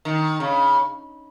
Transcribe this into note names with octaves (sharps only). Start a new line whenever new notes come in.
D#3
C#3